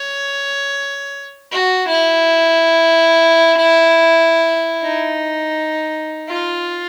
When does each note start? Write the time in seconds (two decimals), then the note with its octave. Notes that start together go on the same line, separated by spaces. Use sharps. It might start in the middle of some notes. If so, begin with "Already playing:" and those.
Already playing: C#5
1.52 F#4
1.88 E4
4.82 D#4
6.28 F4